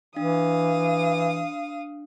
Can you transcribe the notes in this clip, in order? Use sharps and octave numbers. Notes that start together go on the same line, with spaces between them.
E3 D4 F5 D#6